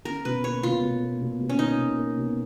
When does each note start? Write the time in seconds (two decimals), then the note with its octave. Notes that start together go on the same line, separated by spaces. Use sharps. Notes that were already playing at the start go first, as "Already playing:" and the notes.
0.05 C#4 A#4
0.25 B2 B4
0.44 A#3 C#5
0.63 B2 F4
0.82 B2
1.02 A#3
1.21 B2
1.40 B2
1.49 C#4
1.59 A#3 D#4
1.78 B2
1.97 A#3
2.17 B2